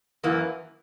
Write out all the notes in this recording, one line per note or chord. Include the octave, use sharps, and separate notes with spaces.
F#2 E3 A#3